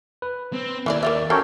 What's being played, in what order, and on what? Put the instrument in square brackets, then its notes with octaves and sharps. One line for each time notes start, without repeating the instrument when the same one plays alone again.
[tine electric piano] B4
[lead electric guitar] C4
[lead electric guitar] D#2 [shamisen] E3 F4 D5
[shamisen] A#3 F4 E5 [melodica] D5
[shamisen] F#3 [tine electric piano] C#4 A4 [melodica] A#4 C#5 G5